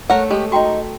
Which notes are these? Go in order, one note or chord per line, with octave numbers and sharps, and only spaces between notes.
A3 A#4 C#5 F#5
G#3 G4 A4
D#4 F#4 G5 A#5 C#6